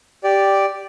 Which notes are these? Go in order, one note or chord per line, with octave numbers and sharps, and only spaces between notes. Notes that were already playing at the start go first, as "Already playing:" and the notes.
G4 D5